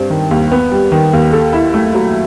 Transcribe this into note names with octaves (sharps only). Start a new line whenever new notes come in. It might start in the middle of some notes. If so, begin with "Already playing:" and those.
Already playing: G2 G3 C4
D#3
D#2
B3
G3
D#3
D#2
A4
E4
A3
F#3